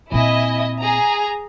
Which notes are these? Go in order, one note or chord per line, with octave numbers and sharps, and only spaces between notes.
A#2 C4 E4 D#5 G#5
G#4 A#5